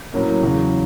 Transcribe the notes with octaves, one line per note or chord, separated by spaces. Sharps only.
A2 F#3 A#3 C#4
E2 C#3 F#3